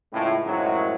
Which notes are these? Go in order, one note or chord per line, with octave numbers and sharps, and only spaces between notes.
C#2 A2
F#2 A2 D#3 F3 F#3 G#3